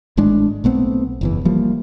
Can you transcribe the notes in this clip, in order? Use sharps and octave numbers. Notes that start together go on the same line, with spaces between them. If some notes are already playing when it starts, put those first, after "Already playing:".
G#1 A2 G#3 D4
B1 A3 B3 C4
F#1 E2 E3
E3 F3 G3 A#3